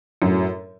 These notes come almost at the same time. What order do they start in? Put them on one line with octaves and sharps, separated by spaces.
F#2 A2 F#3